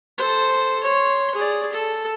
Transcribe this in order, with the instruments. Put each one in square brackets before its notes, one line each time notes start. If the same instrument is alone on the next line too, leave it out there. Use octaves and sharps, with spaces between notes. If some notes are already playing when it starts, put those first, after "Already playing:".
[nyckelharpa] A4 C5
C#5 C6
G#4 D5
A4